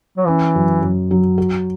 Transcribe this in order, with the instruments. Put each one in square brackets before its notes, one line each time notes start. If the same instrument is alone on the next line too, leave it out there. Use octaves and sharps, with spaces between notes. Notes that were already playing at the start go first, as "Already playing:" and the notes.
[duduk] F#3
[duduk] E3 [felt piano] C#4
[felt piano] F#2
F#2
F#3
F#4